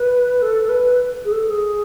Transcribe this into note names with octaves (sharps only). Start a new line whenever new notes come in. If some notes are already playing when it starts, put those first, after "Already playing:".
Already playing: B4
A4
B4
G#4
A4
G#4